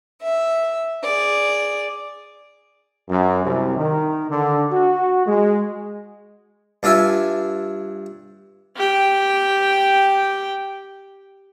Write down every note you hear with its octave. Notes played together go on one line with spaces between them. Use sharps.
E5
G#4 D5
F#2
C2
D#3
D3
F#4
G#3
G2 D4 F4 E5 G#5
G4 G5